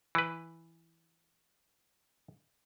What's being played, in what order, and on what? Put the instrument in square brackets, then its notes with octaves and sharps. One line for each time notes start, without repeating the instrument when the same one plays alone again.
[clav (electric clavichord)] E3 B4